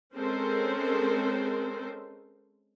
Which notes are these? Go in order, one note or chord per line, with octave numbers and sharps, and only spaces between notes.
G#3 C4 C#4 A4 A#4 C5